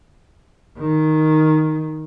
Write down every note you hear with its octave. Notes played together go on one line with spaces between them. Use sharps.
D#3